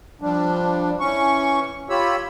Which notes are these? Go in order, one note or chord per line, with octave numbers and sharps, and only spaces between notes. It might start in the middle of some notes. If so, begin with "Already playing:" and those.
F3 G3 D4
E3 C#4 C#6
F4 G4 C#5 B5 E6